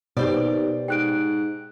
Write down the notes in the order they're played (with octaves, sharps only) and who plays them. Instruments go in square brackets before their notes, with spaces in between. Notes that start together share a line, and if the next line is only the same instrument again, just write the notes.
[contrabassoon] D#2 [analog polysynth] B2 [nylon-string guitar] G4 C5 D5 [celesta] B4
[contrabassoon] G#2 [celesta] G5 F#6 D7